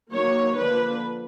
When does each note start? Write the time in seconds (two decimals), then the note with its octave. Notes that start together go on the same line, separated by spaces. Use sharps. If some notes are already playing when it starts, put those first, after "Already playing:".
0.11 D#3 F#3 A#3 C#5
0.56 D3 F3 A#3 D4 B4